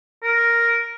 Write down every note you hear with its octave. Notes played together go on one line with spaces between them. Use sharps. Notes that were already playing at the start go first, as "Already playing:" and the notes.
A#4